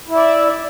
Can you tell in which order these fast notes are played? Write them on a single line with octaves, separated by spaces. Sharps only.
E4 E5 D5